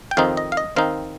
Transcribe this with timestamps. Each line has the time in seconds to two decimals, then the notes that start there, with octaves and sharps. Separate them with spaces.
0.11 G5
0.17 F2 D#3 C4 D#4 F5
0.37 D#5
0.52 F5
0.57 D#5
0.76 D#3 C4 D#4 F5